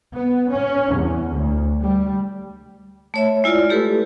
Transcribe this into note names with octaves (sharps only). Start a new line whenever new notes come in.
B3
C#4
E2
D2
G3
A3 C#5 E5
G#3 E4 F4 D5
A3 G4 A4 B4